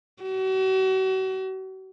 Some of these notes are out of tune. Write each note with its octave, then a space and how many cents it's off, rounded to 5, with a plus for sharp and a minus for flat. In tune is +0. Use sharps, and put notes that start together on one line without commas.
F#4 +40